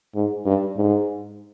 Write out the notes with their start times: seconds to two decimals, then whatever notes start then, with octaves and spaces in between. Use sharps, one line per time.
0.15 G#2
0.46 G2
0.77 G#2